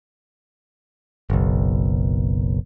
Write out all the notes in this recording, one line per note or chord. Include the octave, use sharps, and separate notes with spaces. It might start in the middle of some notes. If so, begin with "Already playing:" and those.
F#1 B1